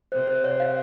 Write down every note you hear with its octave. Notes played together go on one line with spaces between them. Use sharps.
C3 C5
C5
C#5
F5